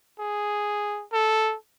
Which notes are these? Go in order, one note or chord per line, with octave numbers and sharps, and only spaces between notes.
G#4
A4